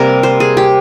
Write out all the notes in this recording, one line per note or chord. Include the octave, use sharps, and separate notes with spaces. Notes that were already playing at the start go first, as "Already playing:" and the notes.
Already playing: C3 G3 A#3 A#4
C5
G#4
G4